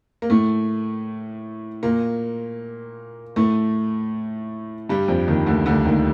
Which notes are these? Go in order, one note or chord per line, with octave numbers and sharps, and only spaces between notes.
A#3
A2 A3
A#2 A#3
A2 A3
G2 G3
F2 F3
D#2 D#3
D2 D3
D2 D3
D#2 D#3